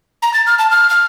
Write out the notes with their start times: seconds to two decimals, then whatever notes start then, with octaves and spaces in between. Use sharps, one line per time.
0.22 A#5
0.34 A6
0.46 F6
0.59 A5
0.71 F6
0.90 F6